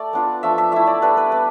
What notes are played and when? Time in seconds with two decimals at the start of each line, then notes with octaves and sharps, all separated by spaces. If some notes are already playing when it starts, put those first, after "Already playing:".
Already playing: A3 D5
0.13 B3 D4 F4
0.43 F3 A3 D4 E5
0.58 E5
0.72 A3 E4 E5
0.87 D5
1.02 G3 B3 D4 B4
1.17 B4
1.32 B3 B4